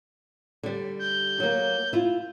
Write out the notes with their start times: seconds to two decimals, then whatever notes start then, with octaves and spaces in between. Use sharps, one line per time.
0.63 D3 G3
0.99 G6
1.40 F#3 A#3
1.93 E4 F4